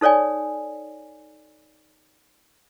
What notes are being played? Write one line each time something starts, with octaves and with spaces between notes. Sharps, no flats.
D#4 A4 C#5 D5 G#5